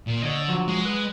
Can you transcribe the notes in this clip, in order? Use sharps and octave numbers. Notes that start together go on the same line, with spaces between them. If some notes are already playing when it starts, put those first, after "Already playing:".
A#2
D3 C#5 D#5
F3 F#3
G#3
B4